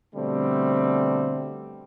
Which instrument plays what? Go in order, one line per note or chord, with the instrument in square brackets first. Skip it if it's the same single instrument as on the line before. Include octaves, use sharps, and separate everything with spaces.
[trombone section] B2 D3 G3 A3 C4